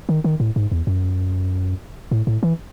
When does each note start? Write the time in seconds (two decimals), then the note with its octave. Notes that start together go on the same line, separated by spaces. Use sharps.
0.09 D#3
0.24 D#3
0.40 A2
0.56 G#2
0.72 E2
0.87 F#2
2.11 A2
2.27 A2
2.43 E3